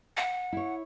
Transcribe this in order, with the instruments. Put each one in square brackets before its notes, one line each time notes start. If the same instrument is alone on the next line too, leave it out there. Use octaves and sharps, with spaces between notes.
[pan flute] F#5
[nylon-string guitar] E4 C#5